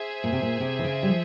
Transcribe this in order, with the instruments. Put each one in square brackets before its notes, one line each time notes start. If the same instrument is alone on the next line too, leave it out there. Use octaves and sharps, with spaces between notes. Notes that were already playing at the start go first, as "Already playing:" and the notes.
Already playing: [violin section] G#4 C5 E5 G#5
[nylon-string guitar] A#2
C3
A#2
C3
E3
C#3
G3
F3